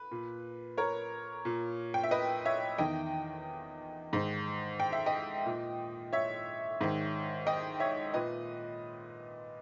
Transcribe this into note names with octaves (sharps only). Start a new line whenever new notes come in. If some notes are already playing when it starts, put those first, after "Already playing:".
Already playing: B4
A#2
A#4 C#5
A#2
G5
E5
B4 D#5
C#5 E5
E2 D#3 D#5 G5
G#2 D#3
G5
E5
D#5 G5
A#2
C#5 E5
G#2 D#3
D#5 G5
C#5 E5
A#2 B4 D#5